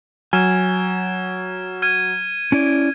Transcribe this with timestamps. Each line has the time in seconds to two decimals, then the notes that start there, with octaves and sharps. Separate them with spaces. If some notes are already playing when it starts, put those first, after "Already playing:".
0.33 F#3 G#5 F6 G#6 E7
1.82 F6 G#6 D#7
2.52 C#4 E4 D5